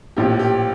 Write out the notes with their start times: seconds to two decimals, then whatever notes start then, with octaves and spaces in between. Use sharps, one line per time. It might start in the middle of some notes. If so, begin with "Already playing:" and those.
0.17 A#1 A2 F3 G4
0.39 G4